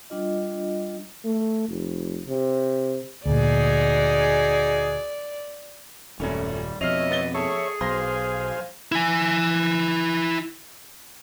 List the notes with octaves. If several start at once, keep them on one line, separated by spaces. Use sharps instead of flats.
G3 D4 F4 D#5
A3
F1
C3
D2 A#2 D#4 F#4 G#4 D5
D#1 F#2 G3 A3 C#4
F2 B2 C#5 D#5 E5 F6 C7 F7
B3 A6 G7
G#4 A4 C#5 E5 C#6
B1 C5 F5 G#5 C6 A#6
E4 G#5